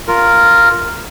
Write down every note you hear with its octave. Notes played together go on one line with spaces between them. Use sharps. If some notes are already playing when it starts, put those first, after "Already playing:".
F4 A#4